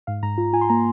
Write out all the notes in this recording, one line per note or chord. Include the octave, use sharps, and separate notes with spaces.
G#2 F5
G#2 A#5
F4
F4 G#5
C6
A#3 A#5